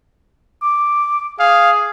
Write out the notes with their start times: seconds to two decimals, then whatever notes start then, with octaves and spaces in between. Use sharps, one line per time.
0.62 D6
1.40 G#4 F5